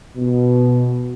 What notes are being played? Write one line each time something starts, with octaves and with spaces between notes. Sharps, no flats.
B2